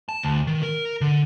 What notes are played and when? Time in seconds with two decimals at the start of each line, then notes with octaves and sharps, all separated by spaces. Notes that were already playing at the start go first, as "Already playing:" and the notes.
0.09 A5
0.23 D2
0.47 D#3
0.63 A#4
1.01 D3